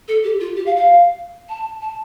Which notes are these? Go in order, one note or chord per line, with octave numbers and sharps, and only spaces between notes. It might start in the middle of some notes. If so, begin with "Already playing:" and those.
A4
G4
F4
G4
F5
F5
A5
A5